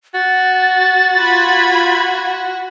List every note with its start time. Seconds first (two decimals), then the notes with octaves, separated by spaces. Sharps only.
0.14 F#4 A6
1.16 F4 B5 G#6